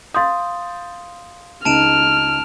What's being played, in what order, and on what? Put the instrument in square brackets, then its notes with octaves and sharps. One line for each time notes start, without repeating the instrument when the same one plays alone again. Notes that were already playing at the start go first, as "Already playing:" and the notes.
[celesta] F5 C6 D#6 [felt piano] G6 A6
[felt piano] C#2 D#4 [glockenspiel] A5 D7 E7 [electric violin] F6